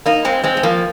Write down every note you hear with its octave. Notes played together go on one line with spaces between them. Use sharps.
A#3 D#4
G#3 C4
G#3 C4
G#3
F3 A#3